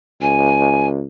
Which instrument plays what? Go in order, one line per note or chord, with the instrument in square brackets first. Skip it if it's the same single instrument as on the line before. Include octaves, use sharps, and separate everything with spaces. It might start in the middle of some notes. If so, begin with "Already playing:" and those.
[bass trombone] C#2 [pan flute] G#5